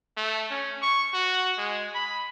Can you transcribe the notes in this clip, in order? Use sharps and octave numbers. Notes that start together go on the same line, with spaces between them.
A3
C#4
C#6
F#4
G#3
B5